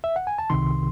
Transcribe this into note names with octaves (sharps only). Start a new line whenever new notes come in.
E5
F#5
G#5
A5
C2 C3 D#3 C6